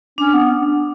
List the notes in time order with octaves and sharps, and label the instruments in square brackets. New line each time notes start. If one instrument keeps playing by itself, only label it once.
[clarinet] C#4 [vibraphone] D4
[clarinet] B3